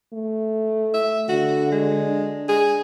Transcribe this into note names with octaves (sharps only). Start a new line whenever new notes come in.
A3
E5
D3 F#4
G#3
D4
G#4